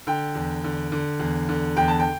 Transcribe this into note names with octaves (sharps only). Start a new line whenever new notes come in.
D3 G5
E2
D3
D3
E2
D3
E2 G5
A5
G5